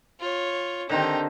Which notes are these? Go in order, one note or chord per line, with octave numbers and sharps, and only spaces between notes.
F4 C#5
D3 D#3 C4 D#4 G4